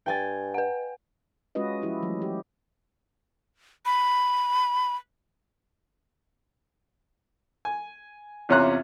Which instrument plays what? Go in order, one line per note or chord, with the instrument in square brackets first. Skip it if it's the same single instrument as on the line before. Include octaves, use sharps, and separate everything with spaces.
[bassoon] G2 [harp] G5 G#5 A6
[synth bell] B4 F#5
[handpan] G#3 C#4 F4 F#4 B4 D#5
F3 E4 G4
E3 F#3 A3
G4
[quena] B5
[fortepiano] G#5
E2 C3 C#4 F4 A#5 F#6